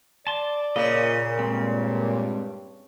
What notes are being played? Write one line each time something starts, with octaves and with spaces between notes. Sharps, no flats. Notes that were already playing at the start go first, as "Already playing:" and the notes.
D5 A5 C6
A#2 C#3 D#5
G2 G#3 C4